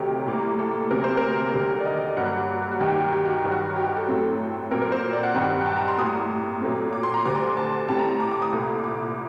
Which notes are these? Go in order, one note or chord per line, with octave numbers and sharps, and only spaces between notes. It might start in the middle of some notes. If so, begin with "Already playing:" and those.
Already playing: D2 C3 D#3 F#3 A3 G4
A2 G3 A#3
A4
D2 C3 F#3 A#3 A#4
C5
A#4
D#2 D3 G3
D5
D#5
G2 F#3 A#3 F#5
F#4
D#2 D#3 G3 G4
G4
F#4
G2 D#3 F#3
F#4
G4
G4
A4
A2 F#3 A3 C4
A#2 F#3 C4 A#4
A#4
C5
D5
F#5
G2 D#3 G3 C4
G5
A5
A#5
C6
A2 G3 A#3 D#6
A#2 F#3 A3 C4
D6
C6
A#5
D2 D3 G3 D6
C6
A5
A2 G3 C4 A5
A#5
D6
D6
D#6
C2 A#2 A3
D6